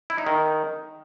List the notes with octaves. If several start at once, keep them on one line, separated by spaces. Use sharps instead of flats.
E4
D#4
D#3